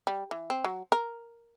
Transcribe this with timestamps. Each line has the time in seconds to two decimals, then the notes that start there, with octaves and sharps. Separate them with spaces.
0.07 G3
0.31 E3
0.50 C4
0.64 F#3
0.92 A#4